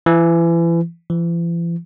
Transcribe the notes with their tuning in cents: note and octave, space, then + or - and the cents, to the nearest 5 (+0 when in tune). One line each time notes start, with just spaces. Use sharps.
E3 +30
E3 +45